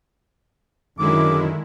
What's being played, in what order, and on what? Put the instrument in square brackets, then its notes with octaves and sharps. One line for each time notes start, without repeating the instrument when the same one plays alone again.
[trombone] F#2 [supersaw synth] D3 G#3 E4 [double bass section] D#3 [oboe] D6